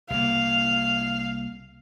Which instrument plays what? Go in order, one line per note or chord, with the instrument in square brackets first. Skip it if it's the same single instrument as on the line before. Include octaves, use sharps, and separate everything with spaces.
[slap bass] C2 A#3 [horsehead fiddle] F5